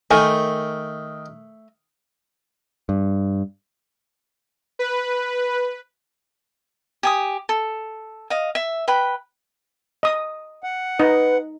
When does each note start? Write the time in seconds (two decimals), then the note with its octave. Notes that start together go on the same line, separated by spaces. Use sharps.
0.11 D#3 A3 A#4 G#5
2.89 G2
4.79 B4
7.03 G4 G#5 D#6
7.49 A4
8.30 D#5 F5
8.55 E5
8.88 B4 G5 B5
10.03 D#5 D#6
10.64 F#5
10.99 D#4 B4 D#5